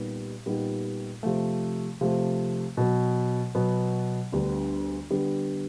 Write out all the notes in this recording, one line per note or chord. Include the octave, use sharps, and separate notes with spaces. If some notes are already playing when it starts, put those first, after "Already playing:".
Already playing: A#2 G3 B3 D#4 G4
A#2 G3 B3 D#4 G4
C3 F3 A3
C3 F3 A3
B2 F#3 B3
B2 F#3 B3
D2 D3 G3 B3
D3 G3 B3